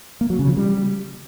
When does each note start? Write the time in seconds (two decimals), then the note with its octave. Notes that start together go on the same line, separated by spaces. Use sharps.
0.21 A#3
0.30 F#3
0.39 C#3
0.48 F3
0.57 G3